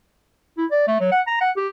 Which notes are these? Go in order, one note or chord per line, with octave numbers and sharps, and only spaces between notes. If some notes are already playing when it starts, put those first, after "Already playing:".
E4
D5
A3
F#3
F#5
A#5
F#5
G4